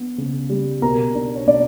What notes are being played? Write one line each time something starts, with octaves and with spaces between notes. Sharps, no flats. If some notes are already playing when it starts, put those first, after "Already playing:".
Already playing: B3 D4
C#3
G3
B2 A#4 A#5
D4
C#5
B2 D4 D5